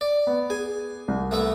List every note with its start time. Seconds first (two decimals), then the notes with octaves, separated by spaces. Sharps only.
0.01 D5
0.27 B3
0.50 G#4 G#5
1.08 C2
1.31 A3 B3 E5